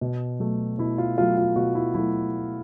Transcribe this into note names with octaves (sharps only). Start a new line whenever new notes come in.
B2
F#3 A3
B2 E4
F4
F#3 A3 F4
F4
B2 F#4
E4
F#3 A3 E4